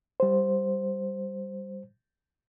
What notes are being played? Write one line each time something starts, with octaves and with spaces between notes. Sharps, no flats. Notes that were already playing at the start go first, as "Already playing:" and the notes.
G3 C5